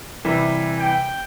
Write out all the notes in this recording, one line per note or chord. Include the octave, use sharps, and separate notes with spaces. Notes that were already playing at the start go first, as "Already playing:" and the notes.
C3 E3 G3
G5